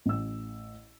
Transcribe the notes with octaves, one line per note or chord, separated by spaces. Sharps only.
A1 E6